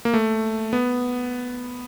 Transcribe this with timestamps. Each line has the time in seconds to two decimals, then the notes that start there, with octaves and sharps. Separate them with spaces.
0.05 A#3
0.14 A3
0.73 B3